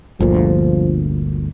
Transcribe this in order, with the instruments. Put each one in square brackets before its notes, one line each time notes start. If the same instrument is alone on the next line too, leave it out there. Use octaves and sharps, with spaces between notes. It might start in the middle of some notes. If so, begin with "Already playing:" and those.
[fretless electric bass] G1 D2 A#2 [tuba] F3